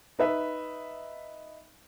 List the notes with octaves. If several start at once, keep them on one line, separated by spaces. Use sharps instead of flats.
D#4 B4 E5